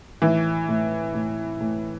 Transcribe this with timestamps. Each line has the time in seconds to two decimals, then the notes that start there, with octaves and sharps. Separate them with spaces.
0.22 A2 E3
0.68 A2
1.14 A2
1.61 A2